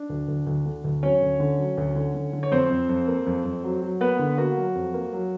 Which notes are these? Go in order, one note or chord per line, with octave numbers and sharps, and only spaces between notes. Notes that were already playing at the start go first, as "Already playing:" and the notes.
Already playing: D4
D2
D2
D2
D3
D2
F#3 C#4 C#5
D2
D3
F#3
D2
D3
D3
D3
C#5
F2 C4 C5
F2
F2
A#3
F2
F2
F#3
F#3
A#3 B3 B4
D3
A#3 F#4
F#3
F2
A#3
F#3